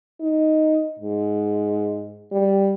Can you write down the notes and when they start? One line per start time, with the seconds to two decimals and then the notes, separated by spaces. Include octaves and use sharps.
0.21 D#4
1.00 G#2
2.32 G3